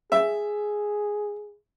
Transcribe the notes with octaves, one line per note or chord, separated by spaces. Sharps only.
G#4 E5